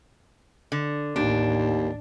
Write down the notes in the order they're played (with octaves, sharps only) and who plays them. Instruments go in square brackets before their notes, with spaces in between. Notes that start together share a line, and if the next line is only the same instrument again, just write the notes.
[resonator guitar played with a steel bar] D3
[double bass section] A1 A2 [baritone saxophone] D#2 [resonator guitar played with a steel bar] D4